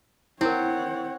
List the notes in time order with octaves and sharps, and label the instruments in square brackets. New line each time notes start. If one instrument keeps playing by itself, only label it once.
[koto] C4 [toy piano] E4 A#4 [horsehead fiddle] C#5 F#5